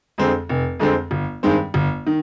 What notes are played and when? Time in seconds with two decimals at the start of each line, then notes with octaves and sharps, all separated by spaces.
0.18 F2 D3 G#3 C4
0.49 F1
0.80 F2 D3 G#3 C4
1.11 G1
1.43 G2 D#3 G#3 C4
1.74 G1
2.07 D#3